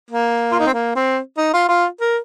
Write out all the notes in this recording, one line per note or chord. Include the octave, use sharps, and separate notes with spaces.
A#3
F4
D#4
C4
A#3
C4
D#4
F4
F4
A#4